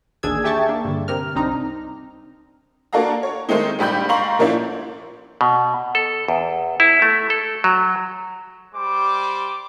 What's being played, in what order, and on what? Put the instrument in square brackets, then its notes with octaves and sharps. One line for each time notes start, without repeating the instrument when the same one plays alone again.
[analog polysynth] A1 D#2 D4 G#4 E6 G#6
G4 G#4 E5 G5 A5 C#6
A#3 D4
G2 D3
C3 A#4 F6
C2 C4 D4 D#4 A#5
[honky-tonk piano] A#3 D4 F#4 A4 F5 A#5
C#5
D#3 G#3 A3 C4 D#4
A#1 G3 G4 B5 G6
G#2 F5 A#5 C6 C#6 F#7
A#2 F3 A#3 C#4 D4 E4
[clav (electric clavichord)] B2
A4
E2
E4
A3
A4
F#3
[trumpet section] G3 C5 D6